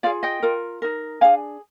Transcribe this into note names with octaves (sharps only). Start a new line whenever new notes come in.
F4 G#4 D5 F5
D#5 G5
F4 A#4
D#4 A#4
D4 G#4 F5 G#5